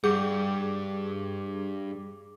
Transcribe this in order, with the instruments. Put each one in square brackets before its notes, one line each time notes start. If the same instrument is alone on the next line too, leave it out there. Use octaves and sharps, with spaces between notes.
[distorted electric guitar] G2 [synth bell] G#4 D6